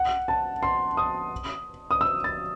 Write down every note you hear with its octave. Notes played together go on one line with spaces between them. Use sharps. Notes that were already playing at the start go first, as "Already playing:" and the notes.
Already playing: F#5
A5
C6
D#6
D#6
E6
A6